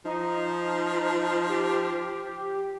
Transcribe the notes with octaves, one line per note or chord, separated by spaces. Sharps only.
F3 D#4
G4